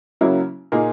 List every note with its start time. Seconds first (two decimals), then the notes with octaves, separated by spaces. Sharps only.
0.21 C#3 F#3 A#3 E4
0.72 A#2 A#3 D#4 G#4